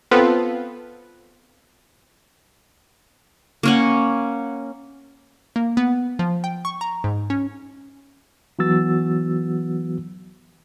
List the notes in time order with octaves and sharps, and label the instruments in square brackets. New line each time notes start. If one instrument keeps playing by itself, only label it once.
[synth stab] B3 C4 F4 A4 B4
[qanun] A#3 C#4 F#5
[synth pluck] A#3
B3
F3
G5
C#6
A#5
G#2
C#4
[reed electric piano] E3 F#3 B3 F#4 E6 A6